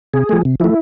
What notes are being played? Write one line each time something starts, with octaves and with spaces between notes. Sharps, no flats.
C3 G#4
F3 A3
C3
F3 A3 E4